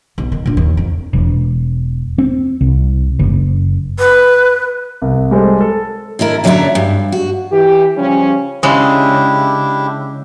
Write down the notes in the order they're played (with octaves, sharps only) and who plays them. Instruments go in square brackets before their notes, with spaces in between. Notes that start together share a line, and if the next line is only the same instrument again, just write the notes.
[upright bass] B1
D#3
A#2 D4
D#2
F2
[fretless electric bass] E1
C4
C2
F#1
[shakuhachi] B4
[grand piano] C2
G3 G#3 A4 C5
A4
[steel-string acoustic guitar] D3 D#3 E4 A#4
F#2 D3 F#3 D5 E5 A#5
G2
F#4
[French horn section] E3 G4
C#3 F3 G3 C#4
[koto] C#3 G#3 [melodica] D4 E4 G4